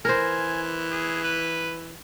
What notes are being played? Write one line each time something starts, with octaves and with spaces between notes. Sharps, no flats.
E3 A#4 C5 G#5
G#4
B4